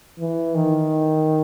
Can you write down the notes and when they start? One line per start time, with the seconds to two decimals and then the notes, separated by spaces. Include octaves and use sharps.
0.19 E3
0.55 D#3